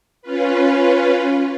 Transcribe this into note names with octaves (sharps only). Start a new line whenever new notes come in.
C#4 F4 B4